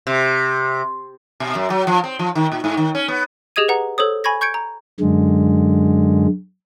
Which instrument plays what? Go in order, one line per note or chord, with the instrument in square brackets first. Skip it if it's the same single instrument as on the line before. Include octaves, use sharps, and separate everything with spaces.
[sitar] C3
B2
F#2
F#3
F3
C4
F3
D#3
A#2
G#2
D#3
C#4
B3
[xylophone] G4 G#4 D#5 D#6 G#6 D#7
B4 F#5 A#5
A4 C5 C#5 D#6
G#5 B5 C#6 G#6 A#6
C#6 G6 G#6 C#7 D7
A#5
[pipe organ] F#2 D3 G#3